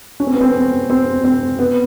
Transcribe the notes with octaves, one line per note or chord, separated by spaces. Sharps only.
C#4
C4
B3
C4
C4
C4
B3